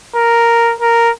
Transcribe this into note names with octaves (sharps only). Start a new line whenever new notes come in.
A#4
A#4